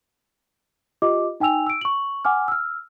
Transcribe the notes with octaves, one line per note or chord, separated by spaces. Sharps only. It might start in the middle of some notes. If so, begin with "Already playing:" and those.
F4 G4 D#5 D6
D#4 G5 G#5 E6 F7
E6 D7
C#6 F#7
F#5 G#5 D6 F6
E6 F6